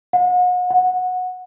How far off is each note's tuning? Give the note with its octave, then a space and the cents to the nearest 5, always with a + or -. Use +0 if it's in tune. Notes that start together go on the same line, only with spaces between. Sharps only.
F#5 -40
F#5 -15